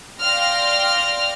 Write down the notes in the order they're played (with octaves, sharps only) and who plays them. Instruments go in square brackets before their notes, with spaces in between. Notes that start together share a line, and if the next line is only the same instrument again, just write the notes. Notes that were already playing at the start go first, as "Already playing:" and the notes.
[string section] D5 F5 G5 C6 F6 A#6